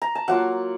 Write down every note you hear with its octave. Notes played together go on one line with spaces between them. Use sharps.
A#5
A5
F#3 A#3 F4 F#5